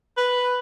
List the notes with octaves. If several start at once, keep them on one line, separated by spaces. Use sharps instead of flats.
B4